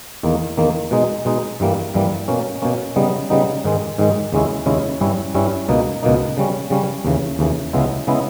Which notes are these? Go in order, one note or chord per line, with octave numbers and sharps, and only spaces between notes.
E2 D#3 A#3
E2 D#3 A#3
B2 G#3 D#4
B2 G#3 D#4
G2 E3 G3 A#3
G2 E3 G3 A#3
B2 A#3 C#4
B2 A#3 C#4
C#3 G3 B3 D#4
C#3 G3 B3 D#4
G#2 D#3 G#3
G#2 D#3 G#3
D#2 C#3 G#3 C#4 E4
D#2 C#3 G#3 C#4 E4
G2 G3 C#4 E4
G2 G3 C#4 E4
C#2 B2 A#3 D#4
C#2 B2 A#3 D#4
C#3 G3 C#4
C#3 G3 C#4
D#2 C#3 E3
D#2 C#3 E3
C#2 C#3 G#3 B3 E4
C#3 G#3 B3 E4